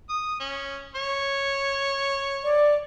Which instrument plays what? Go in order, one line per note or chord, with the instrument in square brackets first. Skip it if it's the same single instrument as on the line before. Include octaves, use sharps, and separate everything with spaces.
[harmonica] D#6
C#4
C#5
[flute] D5